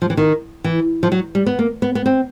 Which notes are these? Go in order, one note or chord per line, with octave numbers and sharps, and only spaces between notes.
F3
E3
D#3
E3
F3
F#3
G3
B3
A#3
B3
B3
C4